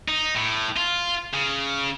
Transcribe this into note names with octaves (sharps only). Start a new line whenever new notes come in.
D#4
A2
F4
C#3